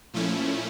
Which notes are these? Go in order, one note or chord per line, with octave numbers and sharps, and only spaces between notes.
A#2 F3 A3 C#4 E4